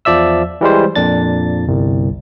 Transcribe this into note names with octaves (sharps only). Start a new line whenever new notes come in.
E2 F3 D5 E5 E6
E3 G3 G#3 C5
F2 A#2 D4 A6
G1 C2